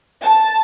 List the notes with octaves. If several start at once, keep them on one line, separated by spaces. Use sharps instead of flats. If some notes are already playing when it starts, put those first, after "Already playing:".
A5